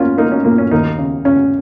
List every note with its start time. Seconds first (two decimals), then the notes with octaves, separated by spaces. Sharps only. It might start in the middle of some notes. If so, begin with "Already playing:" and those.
Already playing: A#3 C#4 F4
0.18 A#3 D#4
0.32 C#4
0.45 A#2 A#3
0.58 C#4
0.71 D#2 A#3 D#4
0.99 C#3
1.25 C#3 C#4